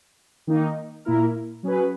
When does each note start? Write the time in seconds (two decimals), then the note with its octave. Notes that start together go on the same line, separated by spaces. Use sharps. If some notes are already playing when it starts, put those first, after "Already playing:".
0.47 D#3 A#3 D#4
1.05 A#2 A#3 E4 A#4
1.63 F#3 C#4 G#4 B4